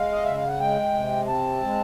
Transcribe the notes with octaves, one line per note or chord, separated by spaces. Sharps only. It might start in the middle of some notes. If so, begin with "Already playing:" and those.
Already playing: G#3 F5
D#5
C#3 E5
F5
F#5
G#3 G5
C3
C4 A5
G#3